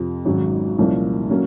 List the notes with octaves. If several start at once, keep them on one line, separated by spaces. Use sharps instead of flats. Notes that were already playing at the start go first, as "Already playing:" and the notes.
Already playing: F2 C3 F3
G#1 G#2 F#3 C#4
C2 A#2 F3 A#3 C#4
F#3 A#3 C#4